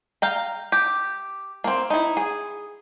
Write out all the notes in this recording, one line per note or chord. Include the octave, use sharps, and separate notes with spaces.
F5 G5 A#5
G4
A#3 C4
D#4 E4
G#4